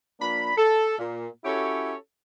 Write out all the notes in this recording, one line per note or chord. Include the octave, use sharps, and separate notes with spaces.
F3 A#3 D4 B5
A4
A#2
C#4 E4 F#4 G4 A4 C#5